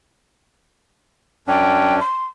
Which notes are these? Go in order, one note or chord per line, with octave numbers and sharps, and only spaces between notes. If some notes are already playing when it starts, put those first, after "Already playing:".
F#2 C#4 D4 G5
C6